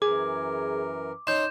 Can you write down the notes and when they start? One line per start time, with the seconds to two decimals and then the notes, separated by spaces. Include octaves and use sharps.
0.02 F#2 E3 G#4 A#4 D6
1.27 C#4 D#4 C6 G6 E7